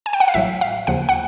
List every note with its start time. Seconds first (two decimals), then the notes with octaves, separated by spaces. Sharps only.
0.06 G#5
0.13 G5
0.20 F#5
0.28 F5
0.34 A1 A2 F#3 E5
0.61 F5
0.87 D#2 C#3 F3 F#5
1.09 F#5